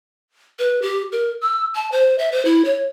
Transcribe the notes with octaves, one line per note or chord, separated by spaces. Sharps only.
B4
G4
A#4
E6
A5
C5
E5
C5
E4
C#5